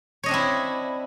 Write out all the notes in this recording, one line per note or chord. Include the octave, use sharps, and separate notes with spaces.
C4 D4 E4 C#5 D#5